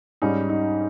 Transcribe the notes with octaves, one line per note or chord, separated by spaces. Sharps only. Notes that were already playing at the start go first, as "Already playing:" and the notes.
G#2 G3 C#4 D#4
D#4